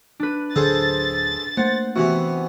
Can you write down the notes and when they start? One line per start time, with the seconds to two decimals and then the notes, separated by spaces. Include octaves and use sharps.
0.20 D4 B4
0.56 D1 D3 G#4 A4 C5 A6
1.57 A3 A#3 C5 F#5
1.96 C3 E3 B3 F#4